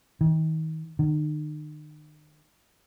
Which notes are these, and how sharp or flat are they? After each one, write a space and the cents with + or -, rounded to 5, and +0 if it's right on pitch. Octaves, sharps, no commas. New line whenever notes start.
D#3 +35
D#3 -45